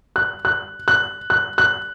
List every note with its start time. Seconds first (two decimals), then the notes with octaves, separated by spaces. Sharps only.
0.16 F#6
0.45 F#6
0.88 F#6
1.30 F#6
1.58 F#6